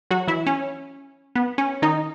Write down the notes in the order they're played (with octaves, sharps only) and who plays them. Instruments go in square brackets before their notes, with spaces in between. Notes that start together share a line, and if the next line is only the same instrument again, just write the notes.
[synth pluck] F#3 F#4
E3 E4
C#4
B3
C#4
D#3 D#4